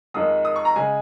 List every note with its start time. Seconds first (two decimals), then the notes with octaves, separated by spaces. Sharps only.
0.14 F2 D#3 G#3 D#4 D#6
0.45 D#6
0.56 C#6
0.65 A#5
0.76 C#3 G#3 G#5